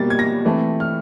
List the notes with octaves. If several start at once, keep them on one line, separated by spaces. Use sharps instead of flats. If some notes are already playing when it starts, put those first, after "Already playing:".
Already playing: B2 G3 A#3 A6
G#6
A#6
E3 A3 C4
F6